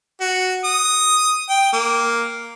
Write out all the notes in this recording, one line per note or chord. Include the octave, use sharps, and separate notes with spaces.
F#4
D#6
G5
A#3